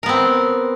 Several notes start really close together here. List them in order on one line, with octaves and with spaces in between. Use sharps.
A#4 B3 C4